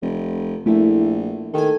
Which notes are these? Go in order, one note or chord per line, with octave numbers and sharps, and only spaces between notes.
F1
A#1 A3 E4
D#3 A4 G#5